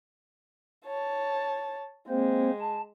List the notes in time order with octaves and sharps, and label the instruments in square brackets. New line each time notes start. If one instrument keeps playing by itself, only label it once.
[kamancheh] C#5 A5
[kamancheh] G#3 [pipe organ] A#3 C4 C5
[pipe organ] A5